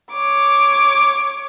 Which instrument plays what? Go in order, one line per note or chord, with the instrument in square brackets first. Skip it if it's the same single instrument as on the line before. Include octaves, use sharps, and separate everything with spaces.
[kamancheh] C#5 D6